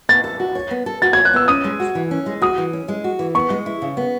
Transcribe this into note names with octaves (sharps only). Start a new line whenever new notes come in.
B3 A6
A4
F#4
C#5
B3
A4
F#4 A6
C#5 G#6
F#6
B3 E6
C#4 D#6
G#3
F#4
E3
C#4
G#3
F#4 D#6
E3
C#4
G#3
F#4
E3
B3 C#6
G#3
E4
C#3
B3